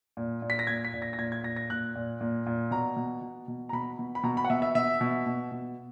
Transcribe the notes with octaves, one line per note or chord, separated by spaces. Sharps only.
A#2
A#2
B6
A#6
A#2 G#6
B6
A#2
A#6
A#6
A#2 G#6
G#6
A#2 A#6
A#6
A#2 F#6
A#2
A#2
A#2
B2 A#5
B2
B2
B2
A#5
B2 B5
B2
B5
B2 A#5
B5
F#5
B2 E5
E5
B2 E5
B2
B2
B2